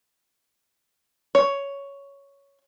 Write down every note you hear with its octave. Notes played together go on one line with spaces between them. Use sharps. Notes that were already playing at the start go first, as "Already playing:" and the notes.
C#5